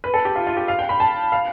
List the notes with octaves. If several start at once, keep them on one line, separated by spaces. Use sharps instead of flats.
B4
A4
G4
F4
F4
G4
F5
G5
B5
A5
F5